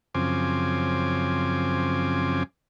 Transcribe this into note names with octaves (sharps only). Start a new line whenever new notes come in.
F#2 C#3 F3 C4 G#5 D6